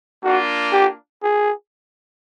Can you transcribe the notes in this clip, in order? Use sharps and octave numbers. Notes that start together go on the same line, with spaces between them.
A#3 D4 F4 F#4
G4
G#4